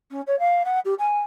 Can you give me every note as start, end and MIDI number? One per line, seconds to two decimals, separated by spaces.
0.11 0.21 61
0.27 0.39 73
0.39 0.63 77
0.65 0.79 78
0.85 0.94 67
0.99 1.20 80